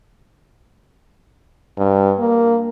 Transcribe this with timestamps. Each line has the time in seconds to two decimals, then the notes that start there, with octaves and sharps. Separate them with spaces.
1.77 G2
2.19 A#3